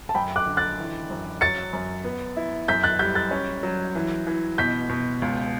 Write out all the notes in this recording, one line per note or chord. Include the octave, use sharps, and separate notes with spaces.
A5
F#2 G5 B5
D6 F#6
D3
F#6 A6
E3
F#2
F#3 A6 C#7
F#2
B3
E4
F#2 G6 B6
F#6 A6
G3 G6 B6
F#6 A6
C#4
F#3
E3
E3
B2 G6 B6
B2
C#2